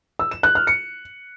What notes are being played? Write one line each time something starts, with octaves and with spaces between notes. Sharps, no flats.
E6
E7
F#6
F6
C#7